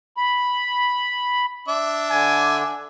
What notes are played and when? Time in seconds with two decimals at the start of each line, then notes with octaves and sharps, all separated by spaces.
0.17 B5
1.68 D4 E5 D6
2.10 D3 G#5